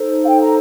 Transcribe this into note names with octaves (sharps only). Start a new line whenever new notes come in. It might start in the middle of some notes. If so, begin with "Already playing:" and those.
Already playing: D#4 A4 C5
F5
G5
A#5